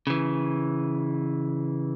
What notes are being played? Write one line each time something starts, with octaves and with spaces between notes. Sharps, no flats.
C#3 E3